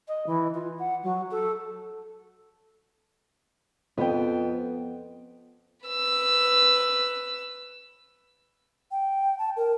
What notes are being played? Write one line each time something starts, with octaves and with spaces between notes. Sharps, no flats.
D#5
E3
F4
F#5
F#3
A4
F2 B3 G5
B4 E6
G5
A5
A#4